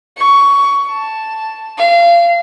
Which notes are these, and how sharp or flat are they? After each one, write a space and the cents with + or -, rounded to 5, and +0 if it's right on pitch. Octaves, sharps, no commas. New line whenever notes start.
C#6 +15
A5 +0
F5 -25